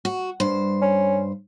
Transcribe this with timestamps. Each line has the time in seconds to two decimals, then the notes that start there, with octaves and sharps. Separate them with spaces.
0.05 F#4
0.40 G2 C5
0.82 C#4